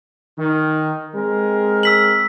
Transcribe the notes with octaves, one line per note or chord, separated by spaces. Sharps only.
D#3
G#3 C4 A#4
E6 B6 F#7